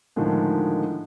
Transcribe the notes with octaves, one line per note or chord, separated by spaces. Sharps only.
A2 D3 D#3 F3 G#3